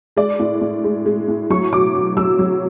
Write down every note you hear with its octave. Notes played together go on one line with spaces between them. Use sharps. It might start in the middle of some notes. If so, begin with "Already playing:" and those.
G#3 D5
A2
A2
G#3
G#3
A2
F#3 C#6
B2 D6
B2
F#3 E6
F#3